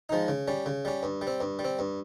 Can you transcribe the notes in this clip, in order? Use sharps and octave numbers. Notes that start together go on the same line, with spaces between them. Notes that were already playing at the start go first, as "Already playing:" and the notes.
F3 G#3 D#4
C#3
G3 C#4
C#3
G3 C#4
G2
G3
C4
G2
G3
C4
G2